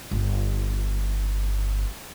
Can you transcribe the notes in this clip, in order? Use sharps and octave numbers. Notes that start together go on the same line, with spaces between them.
G1 F4